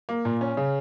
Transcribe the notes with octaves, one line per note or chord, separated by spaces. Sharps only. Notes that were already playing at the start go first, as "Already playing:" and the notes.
A#3
A#2
C#4
C#3